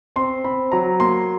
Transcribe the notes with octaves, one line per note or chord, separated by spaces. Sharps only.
C4 C6
C4 B5
F#3 A#5
A#3 C6